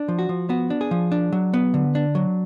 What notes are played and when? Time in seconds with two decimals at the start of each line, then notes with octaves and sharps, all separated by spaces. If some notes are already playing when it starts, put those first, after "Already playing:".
Already playing: D4
0.08 F3
0.19 F#4
0.29 F3
0.49 B3 F#4
0.70 D4
0.81 G#4
0.91 F3
1.12 D4
1.32 F#3
1.54 B3
1.74 D3
1.95 D4
2.15 F#3